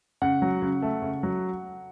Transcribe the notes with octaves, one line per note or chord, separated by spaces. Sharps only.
C#3 F#5
F#3
C#3
A3
C#3
F#3